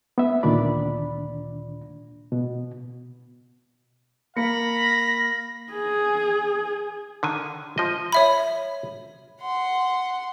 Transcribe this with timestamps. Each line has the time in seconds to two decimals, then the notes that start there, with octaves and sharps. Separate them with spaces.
0.18 B3 E5
0.43 D2 A#2 D#3 D4 D5 B5
2.32 B2
4.36 A#3 F5 B5 A#6 C#7
5.73 G#4
7.23 D3 D#3 G#5
7.78 F3 D#5
8.12 C#5 E5 B5
9.41 F#5 C6